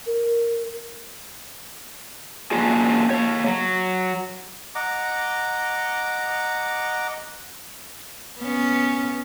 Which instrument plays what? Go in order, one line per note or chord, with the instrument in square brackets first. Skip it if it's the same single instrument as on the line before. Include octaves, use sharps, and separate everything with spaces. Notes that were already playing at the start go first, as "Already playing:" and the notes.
[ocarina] A#4
[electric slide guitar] F#3 A#3 C#4 D4 F4 G#4
A#3 C#5
F#3
[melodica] D#5 F#5 A#5 D6
[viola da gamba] B3 C#4